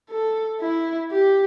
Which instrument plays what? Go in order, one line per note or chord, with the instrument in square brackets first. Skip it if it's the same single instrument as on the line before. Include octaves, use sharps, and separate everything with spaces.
[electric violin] A4
E4
G4